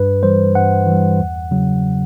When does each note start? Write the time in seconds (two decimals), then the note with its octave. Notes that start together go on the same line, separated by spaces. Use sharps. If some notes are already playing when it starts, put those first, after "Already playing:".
Already playing: G2 B4
0.23 E3 G3 C5
0.55 G2 F#5
0.87 E3 G3
1.20 E2
1.51 C#3 F#3